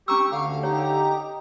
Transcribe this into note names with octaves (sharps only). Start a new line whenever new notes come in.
C#4 G4 A#5 C#6 E6
D2 D3 F5
D#4 G4 C#5 A#5